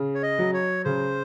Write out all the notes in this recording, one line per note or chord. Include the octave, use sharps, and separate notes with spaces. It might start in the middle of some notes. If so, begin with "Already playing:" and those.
Already playing: C#3
C#5
D#5
F#3
C#5
C#3 C5